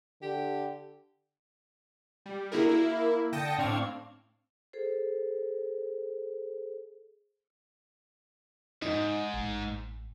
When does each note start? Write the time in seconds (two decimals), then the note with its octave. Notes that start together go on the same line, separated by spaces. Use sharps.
0.22 D3 G4
2.26 G3
2.52 D3 A#3 E4 F#4 G#4 A#4
2.69 A#3 E4
3.32 D3 G5 A5 D#6 A#6 C#7
3.58 A2 C4 D4 C#5 F5 G#6
4.73 G#4 A4 C5
8.82 E2 G#2 D#4
9.34 A1